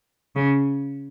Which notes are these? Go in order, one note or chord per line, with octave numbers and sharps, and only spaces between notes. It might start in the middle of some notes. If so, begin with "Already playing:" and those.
C#3